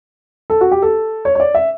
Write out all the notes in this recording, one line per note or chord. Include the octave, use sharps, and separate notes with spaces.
A4
F#4
G4
A4
C#5
C#5
D5
E5